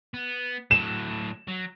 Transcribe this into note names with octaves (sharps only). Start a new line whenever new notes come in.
B3
A2 F#3 E7
F#3